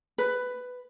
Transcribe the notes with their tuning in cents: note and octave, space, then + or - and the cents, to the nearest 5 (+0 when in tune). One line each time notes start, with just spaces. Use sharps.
B4 +10